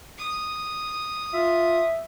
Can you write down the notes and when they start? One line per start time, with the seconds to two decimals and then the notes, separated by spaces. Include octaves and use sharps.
0.17 D#6
1.34 F4 E5